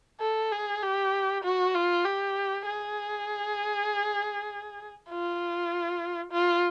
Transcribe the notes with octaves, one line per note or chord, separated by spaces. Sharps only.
A4
G#4
G4
F#4
F4
G4
G#4
F4
F4